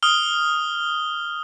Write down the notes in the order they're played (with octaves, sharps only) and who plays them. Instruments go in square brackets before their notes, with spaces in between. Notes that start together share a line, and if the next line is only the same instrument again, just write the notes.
[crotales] D#6 F6 G7